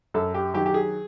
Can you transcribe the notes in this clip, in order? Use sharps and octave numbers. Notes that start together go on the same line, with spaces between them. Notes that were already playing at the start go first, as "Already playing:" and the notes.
F#2 A4
G4
D#3 F#3 G4
G4
G#4